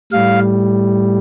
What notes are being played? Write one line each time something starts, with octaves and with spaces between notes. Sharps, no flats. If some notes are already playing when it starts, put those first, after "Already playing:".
A2 G3 F5